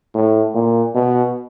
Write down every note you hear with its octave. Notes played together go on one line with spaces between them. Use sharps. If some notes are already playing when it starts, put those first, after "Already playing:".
A2
A#2
B2